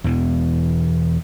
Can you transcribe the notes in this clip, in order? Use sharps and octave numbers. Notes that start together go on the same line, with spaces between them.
E2 B2 E3